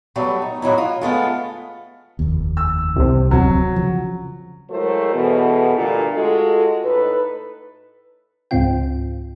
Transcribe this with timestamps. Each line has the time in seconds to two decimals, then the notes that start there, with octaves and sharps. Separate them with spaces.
0.16 F#3 G3 A3 B3
0.42 D#4
0.62 A2 F#3 D#4 E4
0.78 F4
1.01 G#3 A3 B3 F4
2.19 F1 D#2
2.57 E6
2.96 C2 C3
3.31 D1 F2 F#3 C4
3.76 C#3 F3
4.71 F#3 G#3 A3 E4 A#4 C5
5.13 E2 B2 A4
5.76 G2 A#2 D3 A3 F4
6.14 G#3 F4 F#4 A4
6.84 A2 D#4 A4 B4
8.51 C#2 G#2 C#3 C4 F4 G5